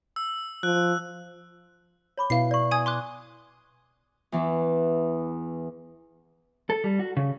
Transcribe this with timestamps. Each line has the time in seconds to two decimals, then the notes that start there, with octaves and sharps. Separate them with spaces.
0.16 E6
0.63 F3 F#6
2.18 C#5 B5 D6
2.30 B2 E4 B4 F5 C7
2.51 D5 C#6
2.71 G#5 D#6 G#6
2.86 C6 D6 F#6
4.32 E2 E3
6.70 A4
6.84 G3
6.99 F#4
7.17 C#3